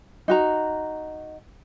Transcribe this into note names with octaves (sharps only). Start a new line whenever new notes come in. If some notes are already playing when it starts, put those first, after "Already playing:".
D#4 F#4 A#5